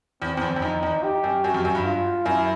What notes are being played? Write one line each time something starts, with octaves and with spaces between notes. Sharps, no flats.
E2 C4
E2
F2
E2
F2 D#4
E2
G4
F#2
F#2 F#4
F2
F#2
G2
F4
F#2 E4